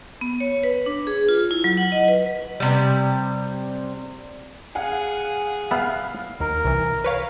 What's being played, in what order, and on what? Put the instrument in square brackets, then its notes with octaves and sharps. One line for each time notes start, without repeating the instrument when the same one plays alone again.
[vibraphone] B3
C#5
B4
D4
G#4
F4
E4
F#3
F#5
D#5
B4
[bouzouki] C3 G3
[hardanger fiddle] G#4 [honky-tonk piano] F5 F#5 G#5
[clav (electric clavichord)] B3 B4 E5 [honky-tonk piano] F5 F6 C7
[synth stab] D#2 [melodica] A#4
[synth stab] C2 E3
B4 C#5 F5